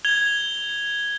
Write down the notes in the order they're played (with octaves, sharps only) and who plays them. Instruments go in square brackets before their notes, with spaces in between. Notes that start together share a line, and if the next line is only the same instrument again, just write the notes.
[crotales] G#6 F7 G7